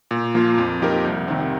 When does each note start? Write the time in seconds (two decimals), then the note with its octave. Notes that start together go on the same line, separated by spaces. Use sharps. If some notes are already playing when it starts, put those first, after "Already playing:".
0.11 A#2
0.34 F3 A#3 F4
0.58 F2
0.82 F3 D#4 G4 A#4
1.04 C2
1.28 C3 D#3 C4